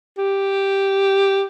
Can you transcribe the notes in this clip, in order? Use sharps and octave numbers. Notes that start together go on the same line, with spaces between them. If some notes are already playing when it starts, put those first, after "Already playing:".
G4